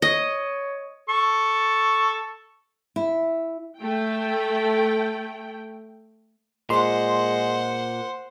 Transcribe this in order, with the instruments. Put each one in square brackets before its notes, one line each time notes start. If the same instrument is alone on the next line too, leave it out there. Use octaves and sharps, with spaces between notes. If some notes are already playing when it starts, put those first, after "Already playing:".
[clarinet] C#5 [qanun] D#5
[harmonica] A4 C#6
[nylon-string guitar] E4
[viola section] A3 G5
[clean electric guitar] A#2 [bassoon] G#3 [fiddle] C5 F#5 [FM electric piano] C6